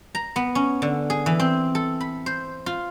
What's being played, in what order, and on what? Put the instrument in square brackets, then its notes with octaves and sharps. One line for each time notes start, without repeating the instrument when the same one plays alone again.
[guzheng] A#5
B3
C#4
D3
G#4
E3
C4
A4
B5
C5
F4